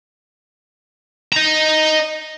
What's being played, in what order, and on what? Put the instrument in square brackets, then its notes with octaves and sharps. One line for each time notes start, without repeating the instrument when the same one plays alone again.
[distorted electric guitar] D#5 A#5